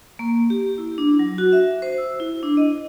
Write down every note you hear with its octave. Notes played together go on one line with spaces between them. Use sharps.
A#3
G4
E4
D4
F#3
F#4
E5
C5
E6
E4
D4
D#5